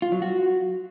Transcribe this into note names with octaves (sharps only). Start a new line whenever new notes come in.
F4
F#3
F#4